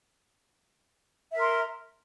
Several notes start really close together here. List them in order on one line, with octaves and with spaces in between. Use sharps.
E5 A#4 C6